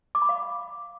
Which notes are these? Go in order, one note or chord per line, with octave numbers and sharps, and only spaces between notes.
D6
B5
F5